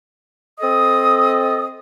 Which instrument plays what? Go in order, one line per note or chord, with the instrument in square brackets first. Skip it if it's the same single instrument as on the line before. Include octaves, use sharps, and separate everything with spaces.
[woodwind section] C4 A4 D#5 D#6